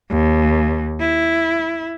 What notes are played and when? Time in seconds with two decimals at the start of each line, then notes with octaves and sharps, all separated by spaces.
0.10 D#2
1.00 E4